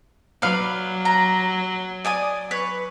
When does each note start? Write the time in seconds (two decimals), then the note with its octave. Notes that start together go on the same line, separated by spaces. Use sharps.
0.42 F#3 B4 D5 F5
1.05 A#5
2.05 D5 G#5 D#6
2.51 B4 C#5